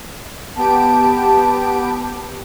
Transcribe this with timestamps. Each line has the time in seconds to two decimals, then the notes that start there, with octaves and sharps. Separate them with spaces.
0.56 B3 G4 A5 D7